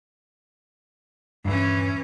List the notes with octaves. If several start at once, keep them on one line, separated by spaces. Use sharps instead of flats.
D#1 G#1 G2 E3 C#4